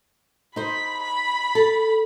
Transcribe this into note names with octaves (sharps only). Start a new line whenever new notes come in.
D#4 C5 B5
B5
A4